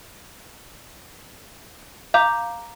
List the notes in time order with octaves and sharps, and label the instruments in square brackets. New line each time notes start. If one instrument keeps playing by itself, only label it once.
[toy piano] F5 [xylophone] A#5 D6 G6